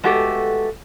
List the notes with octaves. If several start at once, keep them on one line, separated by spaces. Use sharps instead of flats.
G#3 A3 B3 F#4 G4 A4